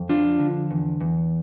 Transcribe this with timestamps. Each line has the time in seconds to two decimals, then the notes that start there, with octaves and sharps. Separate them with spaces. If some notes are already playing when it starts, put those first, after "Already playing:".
Already playing: F2
0.09 F3 D4 F4
0.39 D3
0.71 E2
1.01 E2